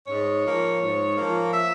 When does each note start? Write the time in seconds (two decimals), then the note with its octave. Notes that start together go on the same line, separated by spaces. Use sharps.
0.07 G#2 C#5
0.44 F3 A#3
0.81 G#2
1.17 F3 A#3
1.53 E5